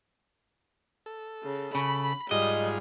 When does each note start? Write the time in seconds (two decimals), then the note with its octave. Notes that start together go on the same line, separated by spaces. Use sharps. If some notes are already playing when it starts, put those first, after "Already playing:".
1.06 A4
1.44 C#3
1.75 C#3 B5
2.31 G#2 F#3 G3 F4 G#4 D#5